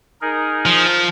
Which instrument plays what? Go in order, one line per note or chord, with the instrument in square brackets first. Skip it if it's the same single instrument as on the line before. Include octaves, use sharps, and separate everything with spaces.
[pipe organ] D#4 G#4 A#4
[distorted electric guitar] F3